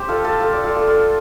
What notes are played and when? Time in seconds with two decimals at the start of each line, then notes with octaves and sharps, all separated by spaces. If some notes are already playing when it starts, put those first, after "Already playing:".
Already playing: G4 C5
0.08 F4 A4
0.24 F4 A4
0.40 F4 A4
0.52 A4 D5
0.64 F4 A4
0.75 F4 A4
0.87 F4 A4